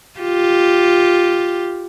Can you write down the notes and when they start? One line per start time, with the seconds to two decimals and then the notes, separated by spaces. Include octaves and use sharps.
0.20 F4 G4